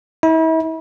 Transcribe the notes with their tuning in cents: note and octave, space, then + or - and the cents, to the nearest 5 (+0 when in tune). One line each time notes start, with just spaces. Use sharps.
E4 -40